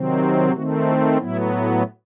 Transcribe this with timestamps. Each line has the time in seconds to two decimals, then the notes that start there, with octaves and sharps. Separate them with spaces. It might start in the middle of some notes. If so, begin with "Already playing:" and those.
Already playing: C3 D#3 F#3 C4
0.20 F#4
0.52 D#3 A3 C4 F#4
0.85 E4
1.17 A2 F#3 B3 E4